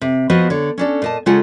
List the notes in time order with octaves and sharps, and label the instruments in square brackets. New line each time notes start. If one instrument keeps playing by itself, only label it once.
[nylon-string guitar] C3
F3 B3 F#4 B4 C5 D#5
D3 C#5
C#4 D4 A4
A#2 D#5 A5
C#3 G#3 F4 G#4 A4 F#5